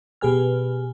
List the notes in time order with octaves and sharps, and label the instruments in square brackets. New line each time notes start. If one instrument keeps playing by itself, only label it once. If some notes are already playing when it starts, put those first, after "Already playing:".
[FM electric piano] B2 G4 G#4 B4 G#5 F6